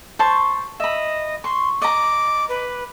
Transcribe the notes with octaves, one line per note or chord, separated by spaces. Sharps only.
C5 A5 C#6
D#5 E5 B5
C6 C#6
D#5 A#5 D6
B4